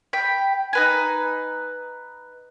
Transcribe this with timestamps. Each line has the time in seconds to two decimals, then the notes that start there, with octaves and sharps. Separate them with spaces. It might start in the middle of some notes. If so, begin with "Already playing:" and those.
0.13 G5 B5
0.73 D#4 B4 G#5